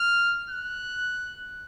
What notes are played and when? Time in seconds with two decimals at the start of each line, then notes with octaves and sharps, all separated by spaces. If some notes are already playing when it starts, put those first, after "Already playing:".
Already playing: F6
0.50 F#6